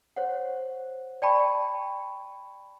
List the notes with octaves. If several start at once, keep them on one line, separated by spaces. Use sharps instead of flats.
C5 C#5 F#5
D5 G5 A5 B5 C#6